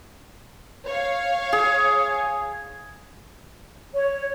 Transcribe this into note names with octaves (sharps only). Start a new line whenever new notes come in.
C#5 F5
G#4
C#5